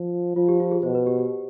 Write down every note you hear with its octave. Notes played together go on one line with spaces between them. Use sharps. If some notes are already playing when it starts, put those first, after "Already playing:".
Already playing: F3
F3 F4
G4
F4
G#4
B2 C5
B4
G4
G4